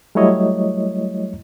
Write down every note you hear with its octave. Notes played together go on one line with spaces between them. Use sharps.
F#3 G3 A3 E4 C#5 D#5